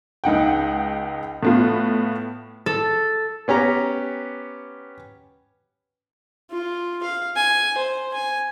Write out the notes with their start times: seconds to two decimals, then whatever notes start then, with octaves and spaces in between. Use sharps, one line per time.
0.24 C#2 D#4 F#5 G5
1.43 A2 B3 F4
2.66 A4
3.48 B3 C#4 G4 A#5
6.51 F4
7.03 F5
7.37 G#5
7.78 C5
8.14 G#5